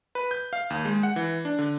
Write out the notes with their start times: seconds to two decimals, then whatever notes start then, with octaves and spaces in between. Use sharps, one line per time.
0.15 B4
0.31 G6
0.53 F5
0.70 D#2
0.85 G#3
1.03 F#5
1.16 E3
1.45 D4
1.59 D3